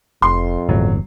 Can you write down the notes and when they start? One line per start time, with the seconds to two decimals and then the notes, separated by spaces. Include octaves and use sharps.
0.22 F1 F2 C6
0.69 G1 E2 A2 F#3